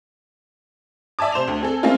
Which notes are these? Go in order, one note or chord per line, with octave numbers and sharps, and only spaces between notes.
D5 E5 G#5 A5 D6
C3 C5 E7 F7
D2
C4 G#4 A4
G#3 A#3 C4 C#4 E4 F4